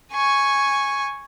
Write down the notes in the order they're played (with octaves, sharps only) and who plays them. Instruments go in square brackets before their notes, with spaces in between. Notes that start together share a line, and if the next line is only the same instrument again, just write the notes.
[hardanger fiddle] G#5 C#6